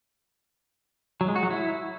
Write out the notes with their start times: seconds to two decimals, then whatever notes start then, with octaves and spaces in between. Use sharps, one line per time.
1.21 F#3
1.28 G#3
1.36 F#4
1.43 F#3
1.50 E4